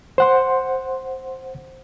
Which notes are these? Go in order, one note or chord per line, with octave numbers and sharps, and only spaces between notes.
C5 F#5 C6